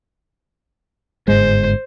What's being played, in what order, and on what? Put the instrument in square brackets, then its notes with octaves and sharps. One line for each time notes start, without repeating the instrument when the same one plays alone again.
[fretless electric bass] G1 G#2 G#3 [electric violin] C5